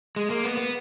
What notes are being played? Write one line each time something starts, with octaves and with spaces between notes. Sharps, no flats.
G#3
A#3
B3
B3